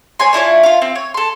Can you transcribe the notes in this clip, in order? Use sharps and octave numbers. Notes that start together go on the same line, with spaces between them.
C#5 G#5 C6
D4 E4 F4 C#5
F4 F5
C4
C#5
A4 C6